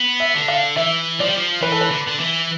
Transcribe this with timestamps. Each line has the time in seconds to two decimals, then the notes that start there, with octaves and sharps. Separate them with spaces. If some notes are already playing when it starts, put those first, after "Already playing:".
Already playing: B3
0.20 E5
0.34 D3
0.48 F5
0.77 E3 E5
1.20 F3 D5
1.27 G3
1.35 F3
1.62 E3 B4
1.72 A4
1.81 B4
1.91 D3
2.07 D3
2.19 E3